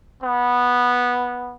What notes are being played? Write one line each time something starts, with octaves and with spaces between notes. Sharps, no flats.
B3